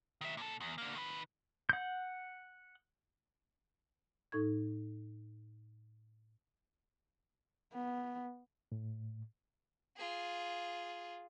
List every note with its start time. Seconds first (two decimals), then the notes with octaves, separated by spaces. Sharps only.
0.21 D#3 E5
0.37 A#2 A4
0.60 E2
0.78 D3 A#3
0.95 D#3 B4
1.69 F#5 G6
4.32 A2 D#4 A4 C#6 G#6
7.74 B3
8.72 A2
9.97 F4 G#4